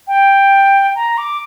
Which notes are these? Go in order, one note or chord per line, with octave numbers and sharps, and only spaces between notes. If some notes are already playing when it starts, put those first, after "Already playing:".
G5
A#5
D6